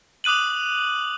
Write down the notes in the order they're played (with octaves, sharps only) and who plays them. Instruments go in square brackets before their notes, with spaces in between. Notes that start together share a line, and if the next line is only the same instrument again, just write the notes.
[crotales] D6 D#6 F#6 D#7 F#7